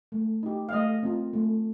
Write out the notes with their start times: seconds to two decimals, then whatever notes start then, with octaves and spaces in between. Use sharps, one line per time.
0.12 A3
0.43 D#4 G4
0.69 F5
0.73 A3 D#5
1.03 C4 F4
1.33 A3